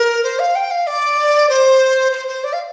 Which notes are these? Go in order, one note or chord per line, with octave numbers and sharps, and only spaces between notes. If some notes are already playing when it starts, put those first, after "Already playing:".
Already playing: A#4
C5
F5
G5
F5
D5
C5
C5
C5
D5
F5